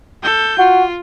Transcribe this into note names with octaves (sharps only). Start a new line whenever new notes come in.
A4 G6
F4 F#4